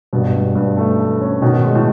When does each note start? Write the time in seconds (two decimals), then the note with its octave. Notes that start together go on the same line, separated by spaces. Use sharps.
0.13 G2 B2
0.34 G2
0.55 G2
0.77 A3
0.99 A3
1.21 C#4
1.42 B2 D#3
1.63 G#3
1.75 A2